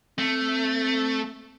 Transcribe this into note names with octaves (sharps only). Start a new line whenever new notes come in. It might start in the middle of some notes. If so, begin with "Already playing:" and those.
A3 C4